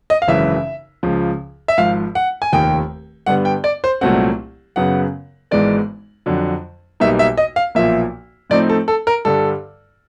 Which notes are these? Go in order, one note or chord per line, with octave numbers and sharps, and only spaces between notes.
D#5
F5
G#1 F#2 C#3 E3 E5
C#2 C#3 F3
E5
G#1 G#2 F3 F5
F#5
G#5
F1 D#2 D#3 G5
G2 D3 G3 B3 F#5
G5
D5
C5
C2 A#2 F#3 A3 C4 F#5
F#2 C#3 F#3 B3 F#5
G#1 G#2 E3 G#3 B3 D5
F2 D3 F#3
B1 B2 G3 A#3 D#4 E5
E5
D#5
F5
B1 A#2 F3 A#3 E5
A2 F3 A3 C4 D#4 D5
A4
A4
A#4
G2 D3 G3 A4